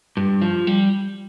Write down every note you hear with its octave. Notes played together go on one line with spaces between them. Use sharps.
G2
F3
G3